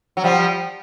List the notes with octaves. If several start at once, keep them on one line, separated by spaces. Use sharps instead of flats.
F#3
F3 G3